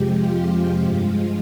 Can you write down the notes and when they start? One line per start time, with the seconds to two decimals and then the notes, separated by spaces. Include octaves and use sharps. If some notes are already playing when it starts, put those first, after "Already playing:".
Already playing: F2 C3 F3 G#3 G4
0.14 F4
0.84 G2 F3 G#3 F4